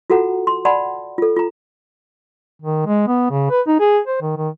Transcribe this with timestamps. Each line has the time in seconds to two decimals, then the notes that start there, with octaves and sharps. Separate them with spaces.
0.10 F4 F#4 A4 F#5 A#5
0.47 C6
0.65 D5 F#5 A5 B5 C6
1.18 F4 A4
1.36 F4 A#5
2.61 D#3
2.87 G#3
3.08 B3
3.31 C#3
3.50 B4
3.68 D#4
3.81 G#4
4.08 C5
4.22 D#3
4.37 D#3